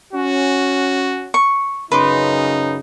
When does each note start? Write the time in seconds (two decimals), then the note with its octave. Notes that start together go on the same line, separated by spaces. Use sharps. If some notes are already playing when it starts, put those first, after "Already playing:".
0.12 C#4 F#4
1.34 C#6
1.92 F#2 C#3 D#4 B4 C6 D6